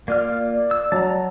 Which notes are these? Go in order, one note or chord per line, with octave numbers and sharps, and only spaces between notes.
A#3 F4 D5 F6
D5
E6
F#3 A5 A#5